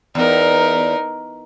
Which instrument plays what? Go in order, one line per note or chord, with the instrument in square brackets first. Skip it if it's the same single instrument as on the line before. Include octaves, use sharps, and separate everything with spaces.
[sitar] E2 [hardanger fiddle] D#4 A#4